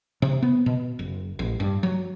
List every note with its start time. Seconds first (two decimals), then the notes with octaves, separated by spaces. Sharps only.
0.22 C3
0.42 B3
0.66 B2
0.99 F#1
1.39 A1
1.60 G2
1.83 F#3